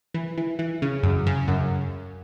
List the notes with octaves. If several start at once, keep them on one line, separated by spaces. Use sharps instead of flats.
E3
E3
E3
C#3
F#2
C#3
F#2